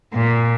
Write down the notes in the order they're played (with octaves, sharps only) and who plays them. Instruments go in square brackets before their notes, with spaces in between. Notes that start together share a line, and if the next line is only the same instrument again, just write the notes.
[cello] A#2